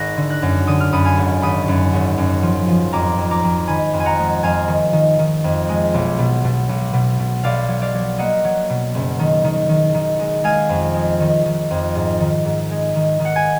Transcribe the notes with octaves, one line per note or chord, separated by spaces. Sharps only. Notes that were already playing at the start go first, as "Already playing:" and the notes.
Already playing: G#1 F#6 A#6
D3
F#6 A#6
F#2
D3 D#6
F6
F#2 B5 D#6
F5 G#5
G#1
G#1 B5 D#6
F#2
G#1
F#2
F3
F3
F2 A#5 D6
F2
A#5 D6
F2
D#3 G#5 B5
F2
G#5
F#5 A#5
G#3
F2 F5 G#5
D#3
D#3
D#3
F2
G#3
B1
B2
B2
B1
B2
B2
B1 D5 F5
F#3
D5 F5
F#3
A#3 D#5 F#5
F#3
B2
F#1
D#3
D#3
D#3
D#3
G#3
G#3 F5 G#5
F2
G#3
D#3
D#3
F2
G#2
D#3
G#2
G#3
D#3
D#3
F#5
G#5